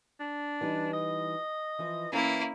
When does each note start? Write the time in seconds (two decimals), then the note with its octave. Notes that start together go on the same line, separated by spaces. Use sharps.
0.20 D4
0.61 E3 G3 D#4
0.93 D#5
1.79 E3 F3
2.12 E3 A#3 C#4 E4